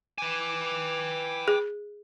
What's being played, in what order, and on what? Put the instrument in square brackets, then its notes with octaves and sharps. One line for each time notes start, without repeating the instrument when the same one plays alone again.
[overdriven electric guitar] B4 G#5 [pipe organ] G5 D6
[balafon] G#4